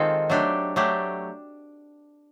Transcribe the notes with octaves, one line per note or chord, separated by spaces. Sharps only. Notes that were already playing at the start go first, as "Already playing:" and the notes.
Already playing: D#3 G#3 C4 F4 A4
F#3 A3 D4 G4
F#3 A3 D4 G4